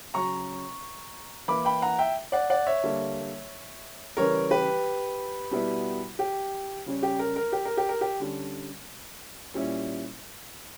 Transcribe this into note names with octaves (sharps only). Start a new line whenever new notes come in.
C#3 F#3 C#4 A#5 C#6
E3 A#3 E4 B5 D6
G5 B5
F#5 A#5
E5 G5
D5 F#5
D5 F#5
C#5 E5
D3 G3 A#3
C#3 E3 G3 A#4 C#5
G4 B4
B2 G3 B3 E4
G4
C#3 G3 C#4
G4
A#4
A#4
G4
A#4
G4
A#4
G4
D3 G3 C#4
A#2 G3 C#4 E4